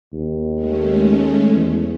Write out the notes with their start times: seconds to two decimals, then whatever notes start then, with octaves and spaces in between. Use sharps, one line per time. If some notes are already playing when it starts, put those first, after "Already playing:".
0.13 D#2
0.53 G#3 A3 C#4
1.54 E2